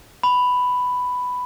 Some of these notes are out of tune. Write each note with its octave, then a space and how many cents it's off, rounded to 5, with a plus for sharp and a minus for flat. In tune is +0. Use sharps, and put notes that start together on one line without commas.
B5 +5